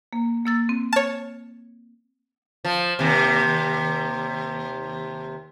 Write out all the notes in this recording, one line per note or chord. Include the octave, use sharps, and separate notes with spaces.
A#3
A#3 E6 A6
C4
C#5 A5 F6
F3
D#2 C3